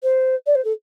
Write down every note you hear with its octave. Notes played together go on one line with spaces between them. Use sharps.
C5
D5
C5
A4